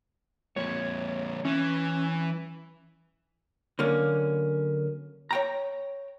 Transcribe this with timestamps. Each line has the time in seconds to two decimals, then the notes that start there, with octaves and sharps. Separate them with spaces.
0.56 F2 A#2 C#5
1.45 E3 C#4
3.79 D3 F#3 A#3 C#4
5.31 C#5 G5 A#5